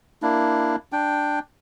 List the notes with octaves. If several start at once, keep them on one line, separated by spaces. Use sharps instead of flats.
A#3 D4 E4
D4 G5